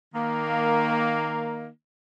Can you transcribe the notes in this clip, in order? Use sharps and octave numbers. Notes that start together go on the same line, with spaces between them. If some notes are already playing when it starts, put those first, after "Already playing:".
D#3 A#3